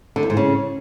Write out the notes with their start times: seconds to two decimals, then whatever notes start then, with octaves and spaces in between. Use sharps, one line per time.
0.16 D3
0.23 E2
0.30 G#2
0.37 C#3